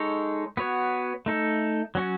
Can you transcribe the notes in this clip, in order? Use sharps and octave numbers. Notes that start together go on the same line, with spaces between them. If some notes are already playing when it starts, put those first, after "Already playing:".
Already playing: G#3 D#4 A4 C#5
B3 F#4 C#5
A3 D#4 A4
F#3 C#4 F#4